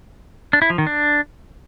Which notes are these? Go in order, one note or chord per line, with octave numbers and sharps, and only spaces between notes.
D4
E4
F3
D#3
D4